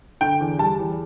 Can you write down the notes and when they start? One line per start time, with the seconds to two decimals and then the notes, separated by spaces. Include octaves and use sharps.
0.21 D3 G5
0.40 E2
0.59 G3 A5
0.79 E2